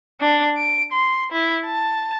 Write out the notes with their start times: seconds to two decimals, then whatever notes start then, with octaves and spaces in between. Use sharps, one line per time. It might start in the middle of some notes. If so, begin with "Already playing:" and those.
0.21 D4
0.58 D7
0.92 C6
1.32 E4
1.65 A5